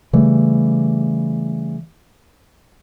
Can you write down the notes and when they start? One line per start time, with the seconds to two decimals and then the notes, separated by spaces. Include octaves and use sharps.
0.13 C#3 E3 G3 A3